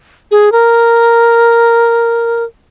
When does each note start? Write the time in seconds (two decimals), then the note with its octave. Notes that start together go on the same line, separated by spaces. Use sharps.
0.31 G#4
0.52 A#4